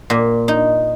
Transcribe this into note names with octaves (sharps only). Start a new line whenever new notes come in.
A#2
D#4